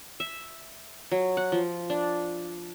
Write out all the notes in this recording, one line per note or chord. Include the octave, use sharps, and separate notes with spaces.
E5
F#3
F#5
F3
D4